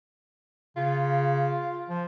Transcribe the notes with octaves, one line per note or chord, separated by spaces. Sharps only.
C#3 F4
F3